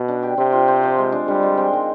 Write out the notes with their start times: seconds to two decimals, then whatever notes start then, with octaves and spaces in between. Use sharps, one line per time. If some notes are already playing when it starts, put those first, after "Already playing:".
Already playing: B2
0.08 D4
0.23 G4
0.37 C3 C4
0.52 F4
0.68 C5
0.83 F3
0.98 G#3
1.12 D4
1.27 D3 G3
1.43 G#3
1.58 C4
1.73 D#3